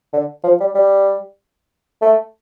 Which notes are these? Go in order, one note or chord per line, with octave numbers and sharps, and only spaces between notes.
D3
F3
G3
G3
A3